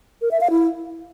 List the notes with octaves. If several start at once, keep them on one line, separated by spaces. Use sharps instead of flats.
A#4
E5
F5
E4